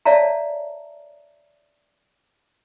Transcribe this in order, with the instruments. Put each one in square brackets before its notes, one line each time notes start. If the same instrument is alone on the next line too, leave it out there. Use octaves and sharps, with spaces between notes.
[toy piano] C#5 D5 E5 F5 A5 A#5